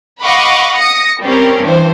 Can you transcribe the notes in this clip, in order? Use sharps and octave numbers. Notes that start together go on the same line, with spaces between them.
D#5 F5 F#5 B5 C#6 D6
D#6 A#6 C#7
G3 C4 C#4 G4 A#4
G2 E3 C5